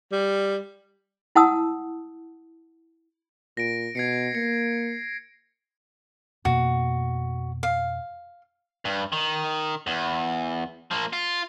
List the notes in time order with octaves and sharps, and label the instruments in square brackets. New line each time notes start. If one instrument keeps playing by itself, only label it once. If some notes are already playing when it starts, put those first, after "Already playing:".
[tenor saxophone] G3
[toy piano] E4 F#5 A5 D#6 E6
[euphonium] A#2 [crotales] A#6 D7
[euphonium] B2 [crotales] G#6 C7 C#7
[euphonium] A#3 [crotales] C#7
[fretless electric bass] F2 B2 A#3 [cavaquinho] F#4
[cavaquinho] F5
[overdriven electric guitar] G2
D#3
E2
F3 A#3
F4